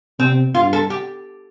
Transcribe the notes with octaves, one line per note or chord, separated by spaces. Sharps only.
C3 C4
G2 F4
A4
G4